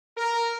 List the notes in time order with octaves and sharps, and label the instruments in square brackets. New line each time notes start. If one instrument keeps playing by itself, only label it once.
[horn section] A#4